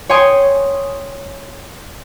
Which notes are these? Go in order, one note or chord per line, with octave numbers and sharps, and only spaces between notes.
C#5 G5 G#5 C6 C#6 D#6